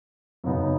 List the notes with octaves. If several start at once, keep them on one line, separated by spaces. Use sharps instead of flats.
F#2 C#3 B3 D#4